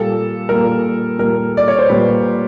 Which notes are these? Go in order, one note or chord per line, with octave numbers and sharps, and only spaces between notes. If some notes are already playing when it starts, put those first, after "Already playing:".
Already playing: A#2 G3 A#3 A4
A#2 G3 A#3 A#4
A#2 G3 A#3 A#4
D5
C#5
C5
A#2 G3 A#3 B4